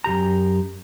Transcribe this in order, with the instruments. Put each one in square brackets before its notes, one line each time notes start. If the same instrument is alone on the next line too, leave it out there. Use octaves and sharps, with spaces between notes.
[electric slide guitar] F#2 B2 G4 A#5